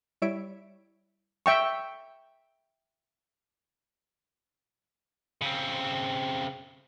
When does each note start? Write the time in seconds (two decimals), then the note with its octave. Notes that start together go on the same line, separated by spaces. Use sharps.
0.22 G3 E4 C#5 E5 D7
1.46 E5 G5 C#6
5.42 C#3 C4